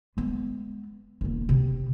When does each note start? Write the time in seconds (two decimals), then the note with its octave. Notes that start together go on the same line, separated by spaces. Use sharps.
0.17 G#3 B3
1.21 E1 A#3
1.49 C3